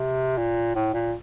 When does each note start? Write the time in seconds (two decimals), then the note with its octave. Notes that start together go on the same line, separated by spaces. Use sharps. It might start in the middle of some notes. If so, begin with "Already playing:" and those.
Already playing: C3
0.37 A#2
0.75 A2
0.94 A#2